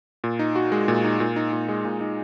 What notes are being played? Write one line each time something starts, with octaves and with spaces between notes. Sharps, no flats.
A#2
D#4
F#4
G#3
A#2
D#4
A#2
D#4
A#2
G#3
A#2
D#4